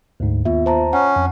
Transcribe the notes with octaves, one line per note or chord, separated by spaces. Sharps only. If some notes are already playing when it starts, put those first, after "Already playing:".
D2 G#2
D#2 B3 F4 E5
C5 A5 A#5
C#4 F#5
F2